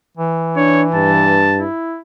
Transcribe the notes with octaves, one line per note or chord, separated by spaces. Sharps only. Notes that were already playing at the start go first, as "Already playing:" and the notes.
E3
D4 C#5
G2 A5
E4